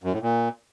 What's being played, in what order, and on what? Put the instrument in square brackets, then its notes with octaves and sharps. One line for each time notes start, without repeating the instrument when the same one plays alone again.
[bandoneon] F#2
A2
A#2